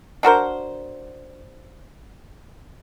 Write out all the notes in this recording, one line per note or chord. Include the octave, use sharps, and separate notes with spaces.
D4 F#4 A#4 C5